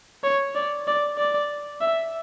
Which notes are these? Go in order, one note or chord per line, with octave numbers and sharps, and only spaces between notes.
C#5
D5
D5
D5
E5